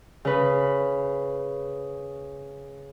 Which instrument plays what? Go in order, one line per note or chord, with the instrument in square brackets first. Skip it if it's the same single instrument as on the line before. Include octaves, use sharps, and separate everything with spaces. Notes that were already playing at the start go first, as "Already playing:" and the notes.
[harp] C#3 B4